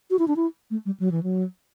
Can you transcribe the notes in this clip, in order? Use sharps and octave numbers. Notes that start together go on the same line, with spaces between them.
F#4
E4
D4
E4
A3
G3
F#3
E3
F#3